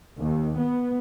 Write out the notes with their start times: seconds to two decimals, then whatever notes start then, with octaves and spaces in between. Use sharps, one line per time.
0.18 D#2
0.60 B3